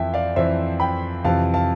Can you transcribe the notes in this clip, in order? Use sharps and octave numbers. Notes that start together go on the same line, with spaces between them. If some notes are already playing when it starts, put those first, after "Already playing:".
Already playing: F2 E3 E5 G5 A5
D5 F5
F2 E3 C5 E5
G5 B5
F2 C3 E3 F5 A5
F5 A5